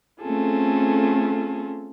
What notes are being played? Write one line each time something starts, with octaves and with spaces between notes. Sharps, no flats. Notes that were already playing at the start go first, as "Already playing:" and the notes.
A3 C4 C#4 F4 G#4 A4